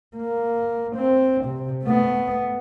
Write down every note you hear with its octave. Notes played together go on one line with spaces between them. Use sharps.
A#3
C4
C3
A3 B3